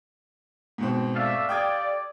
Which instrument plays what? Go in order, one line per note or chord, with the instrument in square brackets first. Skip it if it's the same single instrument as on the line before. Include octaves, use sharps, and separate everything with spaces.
[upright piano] G#2 B2 C4
[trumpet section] A3 D5 E5 [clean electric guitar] A4 F5
[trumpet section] G4 D5 [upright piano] G5 D#6 G#6